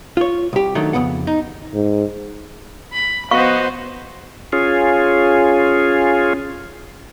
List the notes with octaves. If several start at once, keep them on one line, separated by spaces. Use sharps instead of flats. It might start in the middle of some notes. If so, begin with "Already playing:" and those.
F4 C#5
C2 G4
D#3 F#3 A3 D4
F2 C#3 B3 F#5
D#4
G#2
B5
B3 F#4 C5 D#5 F5 C#6
C#4 F4 G#4